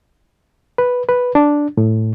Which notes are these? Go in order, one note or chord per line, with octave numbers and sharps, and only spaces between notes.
B4
B4
D4
A2